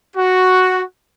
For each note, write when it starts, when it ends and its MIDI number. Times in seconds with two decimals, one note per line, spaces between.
0.17 0.83 66